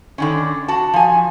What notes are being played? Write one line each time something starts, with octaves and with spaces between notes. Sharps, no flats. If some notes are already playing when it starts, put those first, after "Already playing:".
D3 D#3 C#4
F#4 A5
F3 G#5